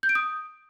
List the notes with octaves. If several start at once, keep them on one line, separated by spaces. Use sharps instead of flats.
G6
D7
D#6